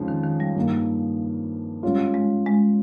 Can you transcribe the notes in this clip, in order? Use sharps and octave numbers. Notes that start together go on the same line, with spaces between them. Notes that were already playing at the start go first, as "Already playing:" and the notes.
Already playing: F2 C#3 F3 G#3 D#4
D#3
D#3
G3
G2 D#3 A#3
G#2 G3 C#4 F4
G#3
G#3